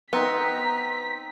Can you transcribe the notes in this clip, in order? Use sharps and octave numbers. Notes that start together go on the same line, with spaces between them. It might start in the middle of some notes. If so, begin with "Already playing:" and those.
B3 C4 D#4 A#5 B6